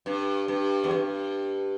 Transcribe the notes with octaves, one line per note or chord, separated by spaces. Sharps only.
G2
G2
E2
G2